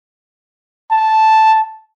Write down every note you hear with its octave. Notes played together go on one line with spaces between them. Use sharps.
A5